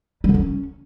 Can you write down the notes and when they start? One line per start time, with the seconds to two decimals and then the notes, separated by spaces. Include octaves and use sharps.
0.24 G3
0.29 D3
0.34 C#4